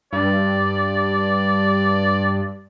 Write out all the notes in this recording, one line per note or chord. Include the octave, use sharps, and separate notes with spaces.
G2 D5